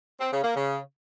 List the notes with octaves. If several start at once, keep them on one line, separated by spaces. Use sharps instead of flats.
C4
C#3
A#3
C#3